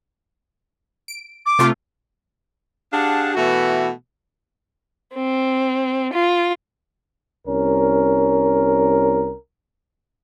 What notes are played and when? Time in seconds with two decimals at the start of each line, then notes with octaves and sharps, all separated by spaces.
1.08 D7
1.46 D6
1.59 C3 A3 F4
2.92 D4 G4 G#4 F5 F#5 A5
3.34 B2 E3 A3 F#4
5.14 C4
6.13 F4
7.47 C2 C#4 A#4